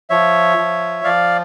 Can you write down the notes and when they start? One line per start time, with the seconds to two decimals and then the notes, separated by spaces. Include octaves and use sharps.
0.10 F3 C#5 E5
0.58 F3
1.04 F3 D5 F5